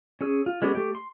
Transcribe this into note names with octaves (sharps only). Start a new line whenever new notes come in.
C#4 G#4 E6
F4
G#3 B3 C#4 G4 A4
A3 G4
C6